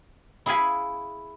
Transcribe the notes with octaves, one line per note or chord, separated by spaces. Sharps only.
E4 G#4 E5 F5 G#5 B5